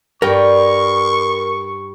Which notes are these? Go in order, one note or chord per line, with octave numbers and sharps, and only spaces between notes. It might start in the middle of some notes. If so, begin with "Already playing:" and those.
G2 A#4 G5 C#6